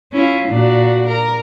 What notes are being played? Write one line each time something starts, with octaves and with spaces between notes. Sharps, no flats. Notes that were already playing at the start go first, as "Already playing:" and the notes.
C#4 E4 F4
A#2 D4 F#4
A#4